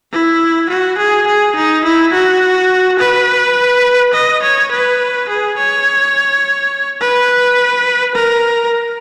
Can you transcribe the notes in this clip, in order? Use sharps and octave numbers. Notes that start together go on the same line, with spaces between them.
E4
F#4
G#4
G#4
D#4
E4
F#4
B4
D#5
C#5
B4
G#4
C#5
B4
A#4